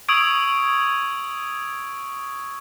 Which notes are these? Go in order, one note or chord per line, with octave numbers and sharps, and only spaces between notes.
C#6 D#6 E6 G#6 D7 F#7